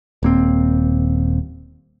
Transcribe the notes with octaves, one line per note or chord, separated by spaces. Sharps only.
D#1 A#3 C4